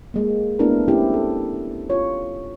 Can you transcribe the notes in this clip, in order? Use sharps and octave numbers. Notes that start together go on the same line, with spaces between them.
G#3 A#3
A3 B3 D4 E4 G4 A#4
A3 C4 C#4 E4 G4
A4
F4 C#5